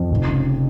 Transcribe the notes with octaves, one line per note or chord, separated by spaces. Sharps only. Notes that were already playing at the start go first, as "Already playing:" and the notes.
Already playing: F2
F1
C#3